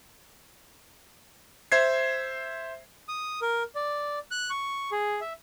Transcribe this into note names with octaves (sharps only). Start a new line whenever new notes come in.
C5 E5 G#6 C7
D#6
A#4
D5
F#6
C#6
G#4
E5